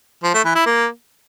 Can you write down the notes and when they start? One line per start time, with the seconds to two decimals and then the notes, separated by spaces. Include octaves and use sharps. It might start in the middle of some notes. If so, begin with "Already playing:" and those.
0.23 F3
0.34 A3
0.45 E3
0.55 E4
0.66 A#3